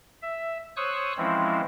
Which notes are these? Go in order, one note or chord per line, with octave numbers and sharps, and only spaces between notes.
E5
C5 C#5 C#6 D#6 E6 F#6
E3 F3 G#3 C4 C#4 E4